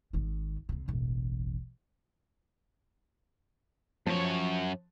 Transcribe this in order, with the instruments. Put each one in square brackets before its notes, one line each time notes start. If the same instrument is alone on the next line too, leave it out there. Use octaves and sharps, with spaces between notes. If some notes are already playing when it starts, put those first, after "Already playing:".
[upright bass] G#1 D#3
C#2 C3
E1 A1
[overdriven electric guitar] F#2 C#5 [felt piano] F3